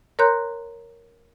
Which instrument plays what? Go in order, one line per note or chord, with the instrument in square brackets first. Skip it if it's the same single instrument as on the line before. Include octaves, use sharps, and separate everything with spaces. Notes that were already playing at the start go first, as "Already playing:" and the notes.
[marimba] A#4 C#5 A#5 C6 F#6 G6